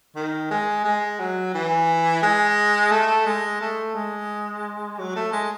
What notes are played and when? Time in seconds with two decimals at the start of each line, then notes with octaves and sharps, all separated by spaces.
0.16 D#3
0.51 G#3
0.85 G#3
1.20 F#3
1.55 E3
2.23 G#3
2.92 A3
3.26 G#3
3.61 A3
3.95 G#3
4.99 F#3
5.16 A3
5.33 G#3